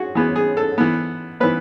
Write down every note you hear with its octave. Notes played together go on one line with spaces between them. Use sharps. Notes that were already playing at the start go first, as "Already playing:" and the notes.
Already playing: F#4 G#4
E3 B3 G#4
G#4
A4
E3 B3
E3 B3 B4